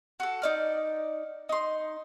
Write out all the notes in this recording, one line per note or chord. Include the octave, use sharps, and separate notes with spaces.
F#4 A4
D#4 D5 F6
D#4 C6